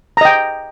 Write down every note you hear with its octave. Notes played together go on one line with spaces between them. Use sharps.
D#5 G5 A#5